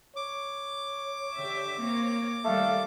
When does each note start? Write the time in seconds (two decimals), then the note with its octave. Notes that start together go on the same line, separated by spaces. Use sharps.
0.16 C#5 D6
1.35 D3 G4 E5
1.80 A#3 C4 C#5
2.45 D#3 G3 A3 A4 F5